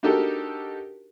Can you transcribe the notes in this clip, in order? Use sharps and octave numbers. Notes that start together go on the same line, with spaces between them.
D4 D#4 F#4 G4 A4 A#4